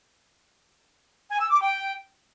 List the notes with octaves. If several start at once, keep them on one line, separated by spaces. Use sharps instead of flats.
G#5
E6
D6
G5